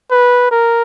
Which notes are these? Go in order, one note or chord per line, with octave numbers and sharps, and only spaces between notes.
B4
A#4